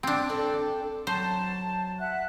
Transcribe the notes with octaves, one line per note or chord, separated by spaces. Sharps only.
C4 D4
A4 D5 G5
F#3 C5 A5
E5 F#5 F#6